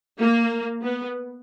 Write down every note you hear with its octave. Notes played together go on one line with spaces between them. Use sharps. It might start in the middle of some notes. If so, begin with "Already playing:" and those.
A#3
B3